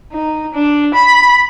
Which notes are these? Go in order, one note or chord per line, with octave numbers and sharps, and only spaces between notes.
D#4
D4
B5